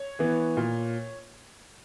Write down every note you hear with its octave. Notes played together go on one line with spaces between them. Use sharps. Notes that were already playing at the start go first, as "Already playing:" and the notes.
Already playing: C#5
E3 B3
A#2